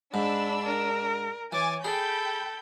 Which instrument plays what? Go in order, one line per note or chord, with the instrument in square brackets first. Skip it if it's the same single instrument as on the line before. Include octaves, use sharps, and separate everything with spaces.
[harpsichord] G#2 [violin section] D4 E6 [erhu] B5
[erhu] A#4
[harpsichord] E3 [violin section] C#5 G#5 A6 [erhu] D6
[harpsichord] G#4 [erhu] A4 [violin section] G5 B5 G6